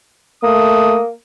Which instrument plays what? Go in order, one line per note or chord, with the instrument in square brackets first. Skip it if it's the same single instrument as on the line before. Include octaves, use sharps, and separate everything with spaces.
[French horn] A3 [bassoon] A#3 [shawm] D#6